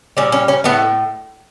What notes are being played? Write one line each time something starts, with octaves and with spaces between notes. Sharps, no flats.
A#2 G3 C#4
C#4
C#4
A2 F3 A3 B3